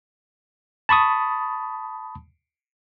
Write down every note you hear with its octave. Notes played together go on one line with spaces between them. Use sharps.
A5 B5 C#6 D#6